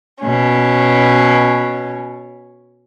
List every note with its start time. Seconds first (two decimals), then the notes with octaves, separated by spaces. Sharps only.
0.20 B2 C#4